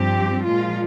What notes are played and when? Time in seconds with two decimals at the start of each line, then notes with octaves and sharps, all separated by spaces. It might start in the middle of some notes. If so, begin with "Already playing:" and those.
Already playing: G2 F3 C4 G4
0.45 A#2 F3 G#3 F4